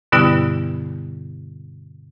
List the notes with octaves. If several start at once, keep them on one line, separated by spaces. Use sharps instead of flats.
G2 B2 D3 G3 B3 E4